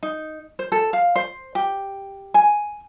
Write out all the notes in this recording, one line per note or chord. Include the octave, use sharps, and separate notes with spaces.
D#4
C5
A4
F5
C5
G4
G#5